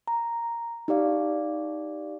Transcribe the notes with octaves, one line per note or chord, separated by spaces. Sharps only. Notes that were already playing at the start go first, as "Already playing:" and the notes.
A#5
D#4 G4 D5 F5